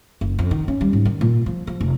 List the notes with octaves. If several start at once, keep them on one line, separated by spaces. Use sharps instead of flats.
F#1
F2
D#3
C#4
G3
G#2
D#3
A#2
F3
F3
F1